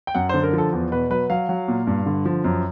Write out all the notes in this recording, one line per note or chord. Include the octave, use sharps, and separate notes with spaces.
G5
F#2 F#5
D3 C5
A#4
F3
A4
E2
B2 B4
F#3 B4
F#3 F5
F#3
A#2
G2
D3
F3
F#2